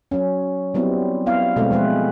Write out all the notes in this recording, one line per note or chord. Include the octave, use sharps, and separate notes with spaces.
F#3 C#4
F#3 G3 B3 C4 E4
B3 E4 F5
B2 G#3 A3 B3 C4
F3 G#3 B4 C5